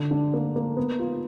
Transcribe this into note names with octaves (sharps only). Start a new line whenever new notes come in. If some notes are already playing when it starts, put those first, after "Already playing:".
Already playing: D3
D4
A#3
A#3
B3
F4